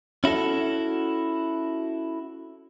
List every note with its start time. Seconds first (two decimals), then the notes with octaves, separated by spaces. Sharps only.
0.24 C#4 E4 F#4 A4